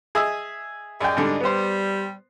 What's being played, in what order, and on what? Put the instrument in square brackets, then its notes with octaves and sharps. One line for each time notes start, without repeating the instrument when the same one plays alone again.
[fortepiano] G#4 D#5 E5
[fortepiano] F#2 G5 [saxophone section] G#4 D5 D#5
[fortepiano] G#2 D3 G3
[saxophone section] G3 [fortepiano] B3 C5